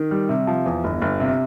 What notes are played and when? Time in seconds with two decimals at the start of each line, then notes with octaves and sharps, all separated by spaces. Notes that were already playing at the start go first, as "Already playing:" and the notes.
Already playing: D#3
0.11 G3
0.29 C3
0.47 F3
0.66 E2
0.84 G1
1.01 G1
1.20 C3